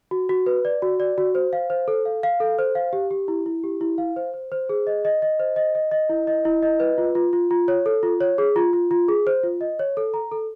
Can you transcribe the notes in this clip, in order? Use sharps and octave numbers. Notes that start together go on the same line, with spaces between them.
F#4
F#4
B4
D5
F#4
D5
F#4
C5
F5
C5
A4
F5
F5
A4
C5
F5
G4
G4
E4
E4
G4
E4
F5
C5
C5
C5
G#4
D#5
D#5
D#5
C5
D#5
D#5
D#5
E4
D#5
E4
D#5
B4
F4
F4
F4
F4
C#5
A4
F4
C#5
G#4
F4
F4
F4
G#4
C5
F4
D#5
C#5
A4
A#5
A4